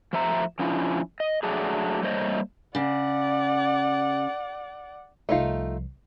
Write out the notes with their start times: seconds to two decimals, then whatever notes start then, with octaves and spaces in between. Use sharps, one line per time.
0.13 F3 A3 C5 E5 A#5
0.59 F3 C#4 D4 E4 F4
1.20 D#5
1.43 F#3 A3 D4 G#4
2.03 G3 A3 A#3 C5 C#5 D#5
2.75 C#3 D5 F#5
5.29 C2 F3 A3 D#4 F4